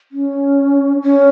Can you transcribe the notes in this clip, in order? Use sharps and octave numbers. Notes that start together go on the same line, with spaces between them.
C#4
C#4